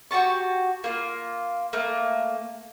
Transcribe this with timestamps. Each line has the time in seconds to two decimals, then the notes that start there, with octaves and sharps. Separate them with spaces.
0.11 F#4 G4 A5 C#6
0.84 A#3 F4
1.73 A3 A#3